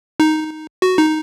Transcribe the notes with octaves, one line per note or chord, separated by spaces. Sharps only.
D#4
F#4
D#4